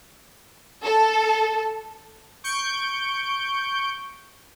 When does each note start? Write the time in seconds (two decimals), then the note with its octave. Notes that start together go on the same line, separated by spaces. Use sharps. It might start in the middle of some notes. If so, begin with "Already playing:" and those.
0.84 A4
2.44 C#6 G6 D7